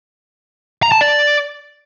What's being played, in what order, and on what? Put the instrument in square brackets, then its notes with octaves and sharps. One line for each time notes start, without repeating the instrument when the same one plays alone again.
[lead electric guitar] A#5
A5
D5